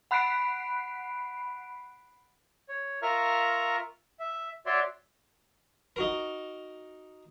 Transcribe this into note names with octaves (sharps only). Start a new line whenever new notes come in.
F#5 B5 F#6 B6 C7 D7
C#5
F4 A#4 E5 A#5 C#6 F6
E5
F#4 C#5 D5 E5 C6
D#4 F#4 A#4